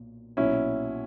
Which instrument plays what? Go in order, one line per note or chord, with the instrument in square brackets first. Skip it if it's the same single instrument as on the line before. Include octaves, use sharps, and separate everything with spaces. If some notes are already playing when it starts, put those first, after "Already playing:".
Already playing: [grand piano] B1 A#2
B1 A#2 F#3 C#4 E4